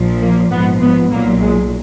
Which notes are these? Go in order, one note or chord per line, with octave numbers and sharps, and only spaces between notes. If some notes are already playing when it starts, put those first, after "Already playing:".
Already playing: A#1 A#2 F3
A#3
A#1 G#2 F3 B3
B3
B1 A#2 F#3 A#3
G#3